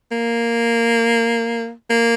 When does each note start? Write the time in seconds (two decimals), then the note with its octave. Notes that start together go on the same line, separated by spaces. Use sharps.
0.11 A#3
1.90 A#3